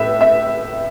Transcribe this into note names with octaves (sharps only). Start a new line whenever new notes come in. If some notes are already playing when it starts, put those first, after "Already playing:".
Already playing: A1 A2 A4 B4 E5
E5